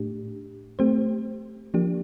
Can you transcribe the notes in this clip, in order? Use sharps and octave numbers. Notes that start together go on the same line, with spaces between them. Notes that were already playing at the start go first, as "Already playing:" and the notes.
Already playing: A2 A3 D4 G4
A3 C4 G4 C5
F3 A#3 D4 G4